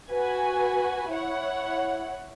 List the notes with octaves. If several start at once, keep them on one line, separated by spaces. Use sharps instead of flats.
F#4 B4 G#5
E4 C#5 F#5